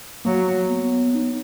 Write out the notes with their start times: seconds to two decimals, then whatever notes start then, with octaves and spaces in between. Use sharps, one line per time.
0.25 F#3 A#3
0.70 B3
1.15 D#4